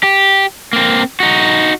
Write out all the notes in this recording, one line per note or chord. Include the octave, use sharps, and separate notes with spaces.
G4
A#3 C4
D#4 F#4